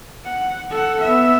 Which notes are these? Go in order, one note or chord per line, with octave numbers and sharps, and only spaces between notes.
F#5
A4 F#5
B3 E5